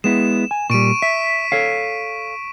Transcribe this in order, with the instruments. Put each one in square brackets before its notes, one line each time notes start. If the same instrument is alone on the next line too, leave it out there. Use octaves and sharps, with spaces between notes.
[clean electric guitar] G#3 B3 E4 [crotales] E7
[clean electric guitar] G#5
[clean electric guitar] A#2 G3 [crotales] C#6 D7 D#7
[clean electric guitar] E5 [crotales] B6
[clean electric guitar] A4 C#5 F5